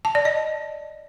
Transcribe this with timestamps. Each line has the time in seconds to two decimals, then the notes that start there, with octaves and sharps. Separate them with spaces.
0.05 A5
0.15 D5
0.25 D#5